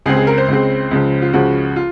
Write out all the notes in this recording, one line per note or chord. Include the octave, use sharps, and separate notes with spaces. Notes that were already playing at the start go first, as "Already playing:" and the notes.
C#2 C#3 G#3 C4 G#4
G#4
A#4
C5
C#2 C#3 G#3 C4
C#2 C#3 F3
F4
C#2 C#3 F3 F#4
F4